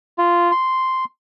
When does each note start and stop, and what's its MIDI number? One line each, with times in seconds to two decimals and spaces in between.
0.18 0.51 65
0.52 1.05 84